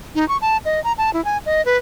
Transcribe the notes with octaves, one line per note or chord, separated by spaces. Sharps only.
D#4
C#6
A5
D#5
A#5
A5
E4
G#5
D#5
B4